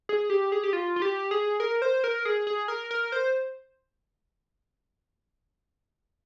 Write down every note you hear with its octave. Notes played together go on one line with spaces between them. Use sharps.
G#4
G4
G#4
G4
F4
F4
G4
G#4
A#4
C5
A#4
G#4
G#4
A#4
A#4
C5